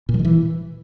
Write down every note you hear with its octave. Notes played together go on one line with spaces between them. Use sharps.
A#2
F#3
D#3
E3